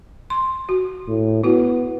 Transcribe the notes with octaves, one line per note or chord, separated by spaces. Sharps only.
C6
F#4
A2
B3 E4 F#4